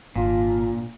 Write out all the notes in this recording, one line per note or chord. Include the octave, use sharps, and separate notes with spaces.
G#1 A#2 D4 F4